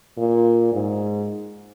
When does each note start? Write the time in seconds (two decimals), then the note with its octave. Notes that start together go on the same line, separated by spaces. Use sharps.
0.18 A#2
0.72 G#2